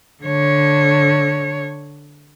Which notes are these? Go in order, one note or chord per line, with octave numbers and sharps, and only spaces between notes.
D3 C#5